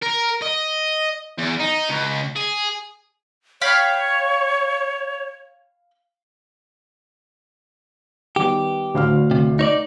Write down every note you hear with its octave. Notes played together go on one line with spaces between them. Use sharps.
A#4
D#5
E2
D#4
C#2
G#4
C#5 F5 G5 B5
D#3 G3 B3 G4
D2 A2 F5 F6
C3
D#4 C#5 D5